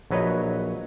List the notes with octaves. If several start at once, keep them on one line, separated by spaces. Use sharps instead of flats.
A#1 F#3 B4 C#5 D#5